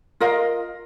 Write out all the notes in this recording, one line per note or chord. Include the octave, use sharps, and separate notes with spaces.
F4 A#4 D#5 F5